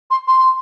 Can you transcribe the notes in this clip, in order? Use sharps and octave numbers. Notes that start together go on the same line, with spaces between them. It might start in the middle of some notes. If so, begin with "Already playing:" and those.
C6
C6